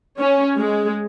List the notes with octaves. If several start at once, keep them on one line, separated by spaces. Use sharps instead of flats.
C#4
G#3